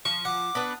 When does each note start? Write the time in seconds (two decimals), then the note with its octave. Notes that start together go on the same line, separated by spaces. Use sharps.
0.05 F3 C#6
0.25 F#5 D6
0.55 B3 D4 B4